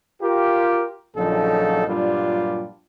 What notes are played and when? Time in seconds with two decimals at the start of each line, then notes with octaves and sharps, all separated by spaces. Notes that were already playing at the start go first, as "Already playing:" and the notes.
0.22 F4 G4 A#4
1.17 A#1 C#3 F3 F#3 D#4 A4
1.87 G2 A#2 F#3 G3 D4 F4